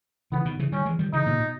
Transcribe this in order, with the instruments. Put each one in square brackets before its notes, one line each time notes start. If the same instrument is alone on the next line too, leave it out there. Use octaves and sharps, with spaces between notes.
[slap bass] C#3 E3 [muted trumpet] B3
[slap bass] B2 D#3
C#3 E3
[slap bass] D#3 G3 [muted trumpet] C#4
[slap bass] E3 G#3
D#3 G3
[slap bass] C#3 E3 [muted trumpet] D#4
[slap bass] A#2 C#3
B2